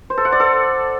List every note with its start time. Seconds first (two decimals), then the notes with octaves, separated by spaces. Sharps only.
0.10 C5
0.18 A4
0.25 F#5
0.32 D5
0.40 A4